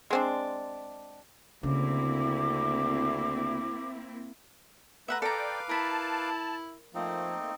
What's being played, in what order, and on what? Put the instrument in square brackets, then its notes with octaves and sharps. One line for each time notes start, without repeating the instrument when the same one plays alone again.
[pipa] G#3 C4 D4
[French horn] D2 [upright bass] C#3 [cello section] A#3 C4 E4 [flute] D6
[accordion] A3 B4 [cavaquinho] E5 F#5 A#5
[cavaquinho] A4 A#5 [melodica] B4 F5 D6 [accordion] D5 G5
[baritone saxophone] E4 [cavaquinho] A#4 B5 [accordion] A5
[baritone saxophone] F3 [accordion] A3 A#3 [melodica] C4 D#4